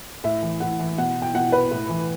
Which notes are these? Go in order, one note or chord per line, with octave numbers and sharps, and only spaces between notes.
A2 E5
E3
A2 F#5
E3
B2 F#5
G5
B2 F#5
B4
A2
E3